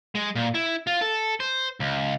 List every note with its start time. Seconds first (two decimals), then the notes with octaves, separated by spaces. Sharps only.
0.15 G#3
0.35 A#2
0.54 E4
0.87 F4
1.01 A4
1.40 C5
1.80 C#2